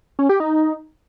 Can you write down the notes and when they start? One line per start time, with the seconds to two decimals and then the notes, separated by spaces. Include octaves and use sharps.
0.19 C#4
0.29 G4
0.40 D#4